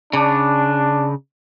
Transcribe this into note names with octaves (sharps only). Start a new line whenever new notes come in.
C#3 D4